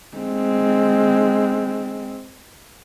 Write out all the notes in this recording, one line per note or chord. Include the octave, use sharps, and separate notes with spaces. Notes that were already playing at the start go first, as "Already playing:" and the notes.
G#3 C4